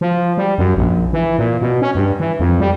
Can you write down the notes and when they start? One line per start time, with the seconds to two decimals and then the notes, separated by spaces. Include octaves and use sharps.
0.01 F3
0.38 G3
0.58 F#2
0.77 A#1
1.13 E3
1.38 A#2
1.61 B2
1.82 C#4
1.95 G2
2.20 E3
2.40 F2
2.60 G3